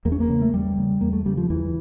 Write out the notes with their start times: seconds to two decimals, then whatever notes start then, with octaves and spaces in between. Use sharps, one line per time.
0.05 E2 A#3
0.12 C#4
0.20 A#3
0.29 C#3
0.42 A3
0.53 E2 G3
0.78 C#3
1.01 E2 A#3
1.13 A3
1.26 C#3 G3
1.37 F3
1.50 E2 E3